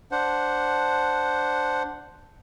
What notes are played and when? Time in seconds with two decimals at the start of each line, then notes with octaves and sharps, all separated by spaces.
0.11 D4 C5 F#5